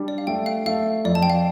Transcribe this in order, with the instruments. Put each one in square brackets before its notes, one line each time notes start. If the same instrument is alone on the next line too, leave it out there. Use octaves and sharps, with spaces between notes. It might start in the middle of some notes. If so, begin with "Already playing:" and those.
Already playing: [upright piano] G3 D4
[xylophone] D5
F5
[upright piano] A3 [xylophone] G5
[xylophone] F5
[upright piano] A3 [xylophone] F5
[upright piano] F2 [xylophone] D5
[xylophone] A5
G5
F5